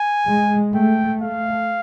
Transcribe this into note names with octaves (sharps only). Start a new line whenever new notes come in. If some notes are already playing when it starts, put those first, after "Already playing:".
Already playing: G#5
G#3
A3 G5
A3 F5